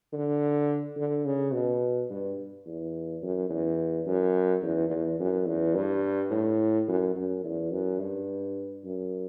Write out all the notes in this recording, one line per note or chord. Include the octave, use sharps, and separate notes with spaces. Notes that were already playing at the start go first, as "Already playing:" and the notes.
D3
D3
C#3
B2
G2
E2
F#2
E2
F#2
E2
E2
F#2
E2
G2
A2
F#2
F#2
E2
F#2
G2
F#2